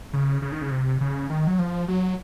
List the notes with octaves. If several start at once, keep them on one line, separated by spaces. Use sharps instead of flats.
C#3
C#3
D#3
C#3
C3
C#3
D#3
F#3
F3
F#3